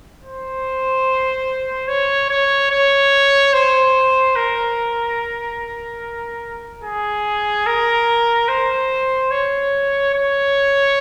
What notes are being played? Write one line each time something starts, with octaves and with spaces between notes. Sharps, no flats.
C5
C#5
C#5
C#5
C5
A#4
G#4
A#4
C5
C#5
C#5